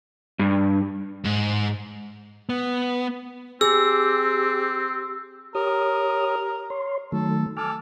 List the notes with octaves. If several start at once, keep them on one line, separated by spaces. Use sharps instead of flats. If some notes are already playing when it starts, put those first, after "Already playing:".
G2
G#2
B3
C4 G4 G#4 E6
G4 A#4 C#5 D#6
C#5 C6
D#3 F#3 A3 A4
A4 G#5 D6 F6